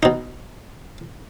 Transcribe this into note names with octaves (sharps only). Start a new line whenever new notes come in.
B2 D#4